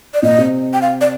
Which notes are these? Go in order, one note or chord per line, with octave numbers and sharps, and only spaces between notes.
D5
A#2 D#5
C3
G5
F5
D5